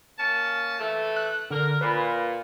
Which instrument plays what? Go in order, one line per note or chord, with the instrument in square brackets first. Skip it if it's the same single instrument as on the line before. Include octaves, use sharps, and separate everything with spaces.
[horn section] A#3 C#4 A5
E3 A3
[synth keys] F#6
[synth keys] D3 [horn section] A#4
[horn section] A#2 [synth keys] B4